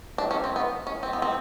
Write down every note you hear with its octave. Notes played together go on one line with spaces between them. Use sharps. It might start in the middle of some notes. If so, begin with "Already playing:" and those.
D4
C#4
C4
B3
C#4
C4
B3
C4